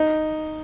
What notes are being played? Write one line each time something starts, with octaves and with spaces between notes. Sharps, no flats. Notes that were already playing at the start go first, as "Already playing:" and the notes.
Already playing: D#4